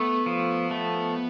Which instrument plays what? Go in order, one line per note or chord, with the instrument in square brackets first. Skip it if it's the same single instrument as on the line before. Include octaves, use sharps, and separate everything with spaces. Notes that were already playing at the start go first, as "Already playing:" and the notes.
Already playing: [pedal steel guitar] A3 [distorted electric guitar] B3
[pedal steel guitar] F3
A3